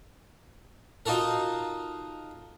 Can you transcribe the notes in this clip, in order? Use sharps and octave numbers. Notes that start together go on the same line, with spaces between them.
D#4 F4 F#4 A4 A#4